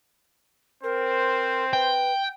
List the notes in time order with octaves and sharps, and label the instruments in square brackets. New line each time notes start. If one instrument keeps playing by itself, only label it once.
[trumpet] C4 [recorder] A#4 [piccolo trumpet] C5
[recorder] B4 [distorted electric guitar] G5